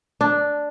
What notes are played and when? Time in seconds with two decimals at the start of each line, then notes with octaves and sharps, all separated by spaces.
0.21 D4